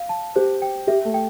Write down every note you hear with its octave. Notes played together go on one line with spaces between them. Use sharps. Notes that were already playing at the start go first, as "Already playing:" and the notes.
Already playing: F5
A5
G4 C5
G5
G4 E5
A3
G5